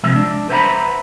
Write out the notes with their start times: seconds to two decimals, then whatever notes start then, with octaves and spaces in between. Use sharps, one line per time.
0.04 C3 F3 G#3 E5
0.16 D4
0.49 B4 C5 E5 F#5 A#5 B5